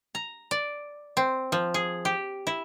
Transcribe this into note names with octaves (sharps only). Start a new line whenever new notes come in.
A#5
D5
C4
F3
G#4
G4
E4